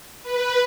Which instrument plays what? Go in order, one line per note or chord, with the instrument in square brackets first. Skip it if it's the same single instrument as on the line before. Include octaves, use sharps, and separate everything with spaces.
[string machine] B4